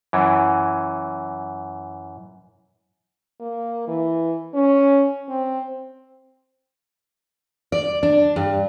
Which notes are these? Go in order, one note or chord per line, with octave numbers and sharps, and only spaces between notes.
F#2 E3
A#3
E3
C#4
C4
D5
D4
G2